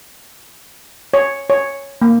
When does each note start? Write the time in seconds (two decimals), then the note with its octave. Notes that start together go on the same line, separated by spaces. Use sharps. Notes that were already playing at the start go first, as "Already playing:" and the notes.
1.14 C#5
1.50 C#5
2.02 A#3